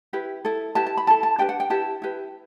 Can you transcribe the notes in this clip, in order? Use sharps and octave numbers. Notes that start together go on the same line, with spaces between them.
E4 G4 B4
E4 A4
E4 G4 B4 A5
A5
B5
E4 A4 A5
A5
D4 G4 B4 G5
F#5
G5
E4 G4 B4 A5
E4 G4 B4